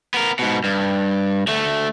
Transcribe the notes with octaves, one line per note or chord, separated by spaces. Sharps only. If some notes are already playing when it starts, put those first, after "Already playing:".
B3 A#4
G#2 B2
G2
D2 A3